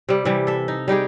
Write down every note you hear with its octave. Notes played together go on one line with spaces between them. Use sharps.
C3 G3
C3 E3 G3
A4 E5
D#4
G3 D#4 G4 G#4